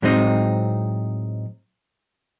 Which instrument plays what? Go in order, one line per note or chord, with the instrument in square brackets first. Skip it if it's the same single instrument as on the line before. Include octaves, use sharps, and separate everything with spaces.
[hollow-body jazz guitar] A2 F#3 G#3 C4 D#4